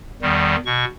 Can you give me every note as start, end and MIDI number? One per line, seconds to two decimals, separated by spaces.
0.22 0.56 40
0.22 0.56 51
0.22 0.56 55
0.65 0.85 47
0.65 0.85 85